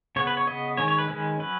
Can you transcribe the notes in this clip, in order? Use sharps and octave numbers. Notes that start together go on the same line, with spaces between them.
C#3 B3 C#5
B4
C#5
C#3 B3 D#5
D#3 G#3 C#4 C#5
C#5
B4
D#3 G#3 C#4
F#3 C#4 B4